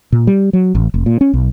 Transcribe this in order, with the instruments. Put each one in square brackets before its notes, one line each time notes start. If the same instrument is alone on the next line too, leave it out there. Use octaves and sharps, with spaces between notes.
[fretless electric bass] A#2
G3
F#3
A1
F1
A#2
C#4
B1